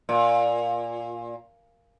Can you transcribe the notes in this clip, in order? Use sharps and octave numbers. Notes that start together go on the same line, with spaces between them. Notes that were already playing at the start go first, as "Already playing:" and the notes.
A#2